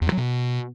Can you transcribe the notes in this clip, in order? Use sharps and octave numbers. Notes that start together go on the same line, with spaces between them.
E2
G2
F#3
B2